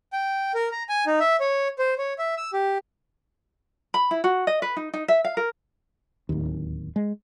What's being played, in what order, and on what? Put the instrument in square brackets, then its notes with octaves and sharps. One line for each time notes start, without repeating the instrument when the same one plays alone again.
[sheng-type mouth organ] G5
A#4
A#5
G#5
D#4
E5
C#5
C5
C#5
E5
E6
G4
[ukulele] B5
E4
F#4
D#5
B4
D#4
D#4
E5
F5
A#4
[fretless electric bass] D1 D#2
G#3